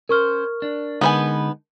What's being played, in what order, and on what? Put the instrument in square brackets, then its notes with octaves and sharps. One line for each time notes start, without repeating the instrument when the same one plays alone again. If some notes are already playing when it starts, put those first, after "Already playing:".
[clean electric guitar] C#4 C5 [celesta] A#4 C#6 F6
[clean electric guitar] D4
[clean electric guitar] D3 G#3 D#4 [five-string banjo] B3 B4 G#5